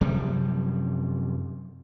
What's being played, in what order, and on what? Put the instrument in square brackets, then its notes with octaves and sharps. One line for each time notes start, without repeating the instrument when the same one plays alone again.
[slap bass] F#2 C3 F3 G3